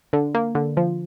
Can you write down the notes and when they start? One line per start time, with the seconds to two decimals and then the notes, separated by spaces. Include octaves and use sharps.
0.13 D3
0.35 A#3
0.55 D3
0.77 F3